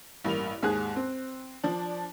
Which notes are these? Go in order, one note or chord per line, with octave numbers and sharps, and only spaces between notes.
A1 G2 A#3 F7
D#2 G#2 G#4 F#6
C4
F3 D4